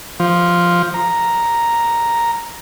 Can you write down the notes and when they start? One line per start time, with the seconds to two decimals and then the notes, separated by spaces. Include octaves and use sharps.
0.20 F3
0.94 A#5